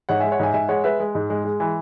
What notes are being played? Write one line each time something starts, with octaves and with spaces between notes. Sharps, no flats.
G#2 C#5 F#5
G#3 E5 G#5
C#5 F#5
G#2 E5 G#5
G#2 E5 G#5
G#3 C#5 F#5
G#3 B4 E5
G#3
G#2
G#3
G#3
E3